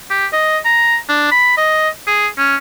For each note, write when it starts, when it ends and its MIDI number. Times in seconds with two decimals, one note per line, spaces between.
0.10 0.26 67
0.33 0.58 75
0.65 0.97 82
1.09 1.31 62
1.31 1.53 83
1.57 1.89 75
2.07 2.28 68
2.38 2.56 61